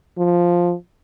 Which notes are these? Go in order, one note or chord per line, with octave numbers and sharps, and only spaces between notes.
F3